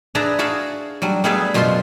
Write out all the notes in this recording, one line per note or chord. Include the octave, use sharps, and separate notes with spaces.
D4 G#4 B4 D5 E5 A#5
F#4 G#4 D5 E5 F5
F#3 G3 D4
G3 A3 B3 G#4 E5 F5
F#2 B2 F4 C5 C6